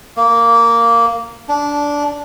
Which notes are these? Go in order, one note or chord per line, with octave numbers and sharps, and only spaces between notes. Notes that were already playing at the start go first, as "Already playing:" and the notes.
A#3
D4